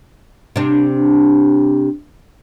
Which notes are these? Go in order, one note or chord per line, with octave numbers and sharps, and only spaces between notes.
C3 D4